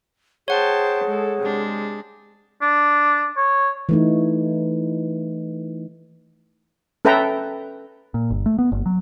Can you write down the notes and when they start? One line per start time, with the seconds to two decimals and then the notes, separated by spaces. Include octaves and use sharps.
0.48 G#4 C5 C#5 F#5 G5 A5
1.04 G#3 A4
1.40 C3 G#3 D4
2.62 D4
3.37 C#5
3.89 E3 A3 D#4
7.05 C#4 A4 B4 E5 G5 A#5
8.14 A#2
8.31 G1
8.46 A3
8.59 B3
8.72 G1
8.86 F#3